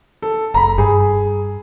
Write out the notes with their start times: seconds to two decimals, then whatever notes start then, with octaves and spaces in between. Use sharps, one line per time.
0.22 A4
0.54 F#1 A#5 B5
0.78 G2 G#4